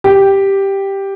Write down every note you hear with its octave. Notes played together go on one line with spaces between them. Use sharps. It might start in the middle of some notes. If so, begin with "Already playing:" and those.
G4